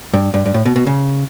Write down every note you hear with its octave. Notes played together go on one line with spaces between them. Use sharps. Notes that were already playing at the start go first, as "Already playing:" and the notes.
G2
G2
G2
A2
B2
B2
C#3